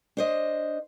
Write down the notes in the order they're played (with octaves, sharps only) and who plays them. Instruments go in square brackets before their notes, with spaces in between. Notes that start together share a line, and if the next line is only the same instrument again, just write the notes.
[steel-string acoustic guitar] D4 C5 D#5